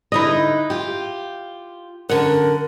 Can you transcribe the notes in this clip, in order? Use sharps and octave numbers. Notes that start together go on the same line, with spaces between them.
D3 D#4 E4 B4 D#5
F4 G4
F#2 D3 A#4 F#5